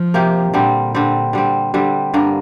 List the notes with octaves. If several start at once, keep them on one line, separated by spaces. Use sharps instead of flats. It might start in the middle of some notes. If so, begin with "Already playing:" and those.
Already playing: F3
C3 A#3 G4
A#2 D3 G3 C4
D3 G3 C4
D3 G3 C4
D3 G3 C4
G2 D3 A#3